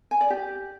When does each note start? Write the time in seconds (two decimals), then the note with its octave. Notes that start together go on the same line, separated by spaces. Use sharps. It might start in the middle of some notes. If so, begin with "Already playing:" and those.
0.11 G#5
0.21 D5
0.30 G4